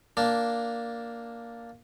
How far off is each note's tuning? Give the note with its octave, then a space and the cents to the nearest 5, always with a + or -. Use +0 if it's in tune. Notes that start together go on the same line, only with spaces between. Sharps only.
A#3 +0 D4 +0 A5 +0